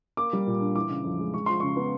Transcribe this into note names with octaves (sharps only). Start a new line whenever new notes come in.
A#3 D6
G3
A#2
D4
E3 D6
C#3
F2
G#3
G#3 C#6
F3 C6
C#3 C#6
B3